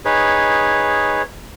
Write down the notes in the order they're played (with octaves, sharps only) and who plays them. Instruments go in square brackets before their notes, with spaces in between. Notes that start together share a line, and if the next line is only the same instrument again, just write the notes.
[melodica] D#4 G#4 B4 C#5